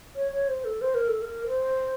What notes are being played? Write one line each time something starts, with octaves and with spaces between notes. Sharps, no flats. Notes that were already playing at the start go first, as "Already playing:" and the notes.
C#5
C#5
C5
A4
C5
A#4
A4
A#4
C5